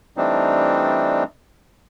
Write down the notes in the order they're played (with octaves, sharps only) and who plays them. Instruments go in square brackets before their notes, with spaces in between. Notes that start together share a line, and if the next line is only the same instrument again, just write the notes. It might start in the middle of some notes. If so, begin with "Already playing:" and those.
[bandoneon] E3 G3 A3 C4 D4 D#4